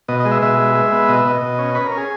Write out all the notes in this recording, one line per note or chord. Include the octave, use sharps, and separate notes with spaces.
B2 D#5
D#5
G#3
E5
B2 E5
G#3
G#3
B3
B2 D#5
E5
B2 D#5
B2
C#4
C#4 B4
A#4
C#4
G#4